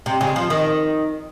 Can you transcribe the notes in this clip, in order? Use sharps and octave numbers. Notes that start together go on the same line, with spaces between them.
C3
C#3
F3
D#3